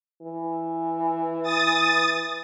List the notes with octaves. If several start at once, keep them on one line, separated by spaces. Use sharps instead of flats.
E3
D#6 A6